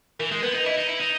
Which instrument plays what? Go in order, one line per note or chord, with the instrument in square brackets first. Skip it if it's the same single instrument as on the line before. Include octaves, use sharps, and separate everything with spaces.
[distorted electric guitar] E3 [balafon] A#4
[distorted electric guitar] G#3 [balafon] A#4
[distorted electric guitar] B3 [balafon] B4
[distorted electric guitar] D#4 [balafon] B4
[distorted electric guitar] E4 [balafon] D#5
[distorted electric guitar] D#4
E4
D#4